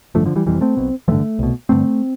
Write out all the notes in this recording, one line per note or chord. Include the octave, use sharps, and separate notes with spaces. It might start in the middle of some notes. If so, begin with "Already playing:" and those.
A1 G2 D3 F3 A3
D3 F3
E3 G3
F1 F2 C3 E3 G3
A3 C4
B1 B2
A1 G2 D3 F3 A3
C2 B2
A1 G2 D3 A3 C4